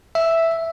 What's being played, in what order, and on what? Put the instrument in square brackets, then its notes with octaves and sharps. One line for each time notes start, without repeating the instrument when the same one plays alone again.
[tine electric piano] E5